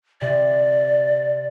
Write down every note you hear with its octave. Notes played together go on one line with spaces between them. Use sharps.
C3 D5